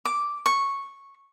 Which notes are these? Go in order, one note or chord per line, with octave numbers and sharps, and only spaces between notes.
D6
C#6